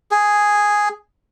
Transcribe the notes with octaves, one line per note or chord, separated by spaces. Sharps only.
G#4